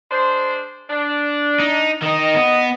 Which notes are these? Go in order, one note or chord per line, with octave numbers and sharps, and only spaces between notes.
G#3 D4 C5
D4
D#4
D#3 D#4 D#5
B3